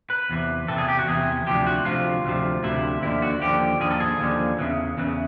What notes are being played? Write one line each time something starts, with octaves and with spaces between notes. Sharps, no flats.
B4
E2 C3 E3
E2 C3 E3 A4
G#4
G4
F#4
E2 C3 E3 G#4
D2 C3 F3 G4
F#4
D2 C3 F3 F4
D2 C3 F3
D2 C3 F3 E4
D#2 D3 F3 E4
F#4
D#2 D3 F3 G4
D#2 D3 F3 G#4
A4
G#4
D#2 D3 F3
E2 C#3 E3
E2 C#3 E3